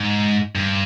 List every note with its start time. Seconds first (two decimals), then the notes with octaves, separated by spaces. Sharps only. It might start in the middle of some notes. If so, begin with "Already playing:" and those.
Already playing: G#2
0.55 G2